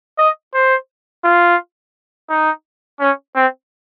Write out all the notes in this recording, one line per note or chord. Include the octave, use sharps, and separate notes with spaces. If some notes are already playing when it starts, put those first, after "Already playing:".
D#5
C5
F4
D#4
C#4
C4